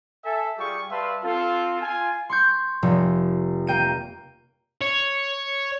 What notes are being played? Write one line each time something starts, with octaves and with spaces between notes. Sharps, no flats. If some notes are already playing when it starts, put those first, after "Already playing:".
A4 E5 G#5
G3 F4 G4 G#4 G5 C#6
G3 B4 E5 F5 A5 C6
C4 F4 A4
F4 G#5
C6 C#6 G6
F1
A#3 G5 D#7
C#5